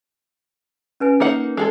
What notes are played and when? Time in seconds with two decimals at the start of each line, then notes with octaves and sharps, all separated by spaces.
1.00 C#4 B4 G#5
1.20 A#3 D#4 F#5
1.57 G#3 G#4 A4